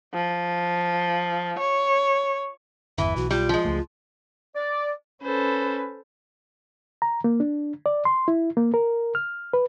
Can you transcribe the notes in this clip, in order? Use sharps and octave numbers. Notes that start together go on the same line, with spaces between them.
F3
C#5
G1 E2 E3 E5
B1 F#4
G3 F4
F3 G#3
C#2 A3
D5
C#4 A4 B4 C5
A#5
A#3
D4
D5
C6
E4
A#3
A#4
F6
B4